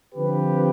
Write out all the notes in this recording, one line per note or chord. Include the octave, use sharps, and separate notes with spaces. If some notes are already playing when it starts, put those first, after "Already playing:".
D3 F3 C4 G4 B4